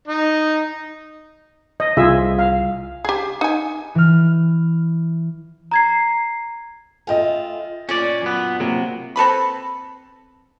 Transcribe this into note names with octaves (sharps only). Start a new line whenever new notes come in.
D#4
D#5
C2 F4 G#4 E5
F5
G4 G#4
D#4 G#5
E3 F6
A#5 G#6 C7
A3 F4 D#5 G5 G#5
A#2 C#4 D4 D5
F#2 B3
C3 F#3 A#3
C4 A4 B4 B5